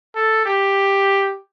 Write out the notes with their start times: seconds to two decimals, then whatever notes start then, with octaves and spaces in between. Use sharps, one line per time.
0.15 A4
0.45 G4